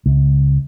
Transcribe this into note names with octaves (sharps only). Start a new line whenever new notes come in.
C#2